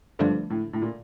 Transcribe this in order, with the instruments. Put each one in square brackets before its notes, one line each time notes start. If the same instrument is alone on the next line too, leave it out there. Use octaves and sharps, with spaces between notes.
[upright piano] G2 [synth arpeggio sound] D3 F3 A3 D4 F4
[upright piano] A2
A2
A#2